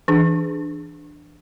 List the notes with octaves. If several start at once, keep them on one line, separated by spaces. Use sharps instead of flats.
E3 D4 G#4